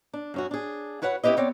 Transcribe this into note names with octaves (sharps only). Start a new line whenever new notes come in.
D4
F#2 C#4 F#4
D4 G#4
E4 F#4 B4 C#5 F#5
C4 C#4 E4 G4 B4 D#5
B3 C4 C#5 D5